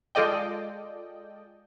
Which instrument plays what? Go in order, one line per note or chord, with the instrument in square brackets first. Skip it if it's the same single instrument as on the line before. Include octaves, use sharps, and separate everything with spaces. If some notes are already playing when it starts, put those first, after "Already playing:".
[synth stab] G#3 F4 A4 D5 D#5 G5